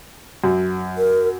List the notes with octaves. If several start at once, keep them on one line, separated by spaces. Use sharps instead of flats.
F#2
A#4